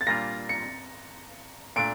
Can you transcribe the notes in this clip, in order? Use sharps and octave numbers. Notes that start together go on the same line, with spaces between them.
A6
A#2 G3 A#3 D4 F4 A#6
C#7
A#2 A3 D4 D7